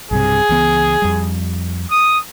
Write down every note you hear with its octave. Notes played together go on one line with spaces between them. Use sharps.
B1 G2 C3 G#4
C#2 E3 B3
F2 G3
D#6